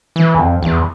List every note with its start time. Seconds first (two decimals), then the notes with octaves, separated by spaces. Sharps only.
0.16 E3
0.35 E2
0.39 F2
0.63 E2